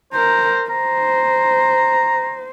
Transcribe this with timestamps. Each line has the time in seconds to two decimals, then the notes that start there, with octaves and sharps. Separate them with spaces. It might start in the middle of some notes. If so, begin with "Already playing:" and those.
0.13 A#4 C5 A#5
0.70 C5 A#5